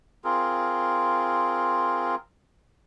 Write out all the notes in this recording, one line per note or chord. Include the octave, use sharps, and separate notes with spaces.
C4 F4 G#4 A#4